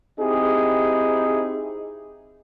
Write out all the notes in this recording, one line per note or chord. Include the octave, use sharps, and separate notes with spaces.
C4 D#4 E4 G4 G#4